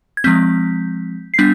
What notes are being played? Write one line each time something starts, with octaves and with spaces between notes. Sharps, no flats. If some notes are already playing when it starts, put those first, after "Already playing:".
G#6
F3 G#3 C4 G6 B6
C7
G3 B3 D4 G6 B6